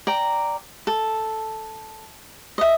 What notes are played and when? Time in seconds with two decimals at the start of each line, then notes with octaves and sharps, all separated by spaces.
0.07 D5 G5 A#5
0.87 A4
2.58 D#5 E5